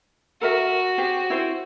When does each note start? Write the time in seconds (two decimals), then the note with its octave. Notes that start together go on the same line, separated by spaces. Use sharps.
0.41 F#4 A4 A#4 E5
0.98 G4 G#4 C5
1.30 E4 C5